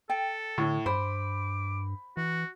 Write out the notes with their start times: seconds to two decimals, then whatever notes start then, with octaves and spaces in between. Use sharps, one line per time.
0.10 A4 G5
0.58 A2 D3
0.86 G2 C5 B5 D6
2.17 E3 F#4